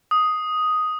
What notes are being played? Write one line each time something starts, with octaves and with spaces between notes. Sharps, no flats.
D#6